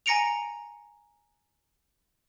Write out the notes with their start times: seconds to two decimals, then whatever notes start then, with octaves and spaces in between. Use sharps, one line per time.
0.06 G#5 A#5 A#6 C#7 D7 F7